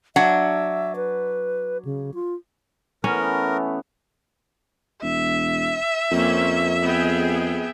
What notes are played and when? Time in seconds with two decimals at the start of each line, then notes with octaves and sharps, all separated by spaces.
0.16 F#3 D4 E5 F#5
0.96 B4
1.85 C#3
2.14 F4
3.04 E3 A3 B3 C#4 A#4
5.02 E1 E5
6.11 F2 A#3 C4 C#4
6.82 B3 G#4 G5